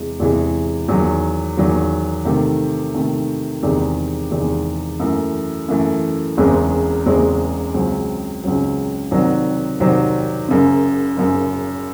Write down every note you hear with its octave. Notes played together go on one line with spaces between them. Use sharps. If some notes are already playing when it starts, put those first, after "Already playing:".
Already playing: E2 C3 E3 G#3
E2 C3 E3 G#3
E2 D#3 F#3
E2 D#3 F#3
C3 D#3 A3
C3 D#3 A3
E2 C3 D#3 G#3 D#4
E2 C3 D#3 G#3 D#4
F#2 E3 A3
F#2 E3 A3
F#1 E2 C#3 G#3 C4
F#1 E2 C#3 G#3 C4
C#2 C#3 F#3 C4
C#2 C#3 F#3 C4
C2 C3 D#3 F#3 C4
C2 C3 D#3 F#3 C4
F#1 F#2 C#3
F#1 F#2 C#3